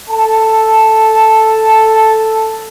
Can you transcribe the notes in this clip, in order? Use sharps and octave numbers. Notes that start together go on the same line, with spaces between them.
A4 A5